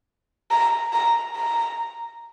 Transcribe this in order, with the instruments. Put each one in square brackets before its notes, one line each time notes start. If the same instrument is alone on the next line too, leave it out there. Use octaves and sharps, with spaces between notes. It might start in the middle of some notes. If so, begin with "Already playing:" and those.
[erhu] A#5
A#5
A#5